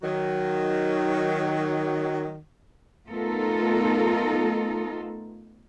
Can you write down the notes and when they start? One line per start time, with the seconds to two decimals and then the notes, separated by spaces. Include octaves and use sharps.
0.03 D#3 F#3
3.09 A3 B3 D#4 F4 A4 A#4